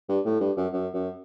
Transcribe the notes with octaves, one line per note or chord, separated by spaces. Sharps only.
G2
A2
G2
F#2
F#2
F#2